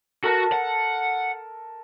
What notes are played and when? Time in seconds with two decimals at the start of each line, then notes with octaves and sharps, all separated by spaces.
0.23 F#4 A4 A#4 A5
0.52 F#5